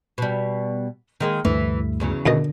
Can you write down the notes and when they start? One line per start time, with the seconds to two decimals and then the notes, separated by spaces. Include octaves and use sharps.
0.18 B2 G3
1.20 D#3 G#3 A#3
1.45 D2 G2 E3 A3
2.00 E2 C#3 F#3
2.26 D#2 B2 D3 D#5